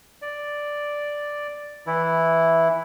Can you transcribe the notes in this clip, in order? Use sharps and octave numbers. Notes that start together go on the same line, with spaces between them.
D5
E3 E4